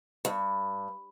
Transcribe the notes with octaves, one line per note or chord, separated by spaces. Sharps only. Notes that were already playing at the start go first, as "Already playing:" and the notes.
G2